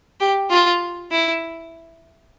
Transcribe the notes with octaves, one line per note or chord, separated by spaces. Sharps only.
G4
F4
E4